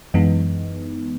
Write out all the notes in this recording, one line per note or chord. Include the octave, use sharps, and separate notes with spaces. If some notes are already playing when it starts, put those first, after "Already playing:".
F#2 E3 G#3 B3 D#4